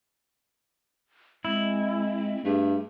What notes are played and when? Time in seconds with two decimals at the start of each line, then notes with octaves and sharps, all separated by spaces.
1.45 G#3 C4 E4
2.45 G2 A3 G#4